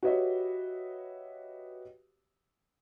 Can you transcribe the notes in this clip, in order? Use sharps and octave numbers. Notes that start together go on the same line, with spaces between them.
F#4 G4 B4 C#5 D#5 E5